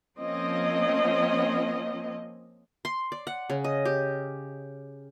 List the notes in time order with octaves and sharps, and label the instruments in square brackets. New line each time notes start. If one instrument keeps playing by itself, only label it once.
[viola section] F3 A#3 C4 C#4 D#5
[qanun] C6
D5
F#5
C#3
D#5
G4